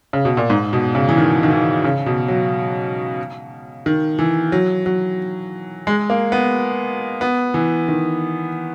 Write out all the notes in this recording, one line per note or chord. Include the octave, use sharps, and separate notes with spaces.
C#3
B2
A#2
G#2
B2
C#3
E3
D#3
D#3
E3
C#3
B2
F#3
D#3
E3
F#3
F#3
G#3
A#3
B3
B3
E3
D#3